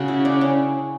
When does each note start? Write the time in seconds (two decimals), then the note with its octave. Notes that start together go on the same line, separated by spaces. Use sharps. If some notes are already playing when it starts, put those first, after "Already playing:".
Already playing: C#3 F#4
0.08 E4
0.25 D4
0.41 C#4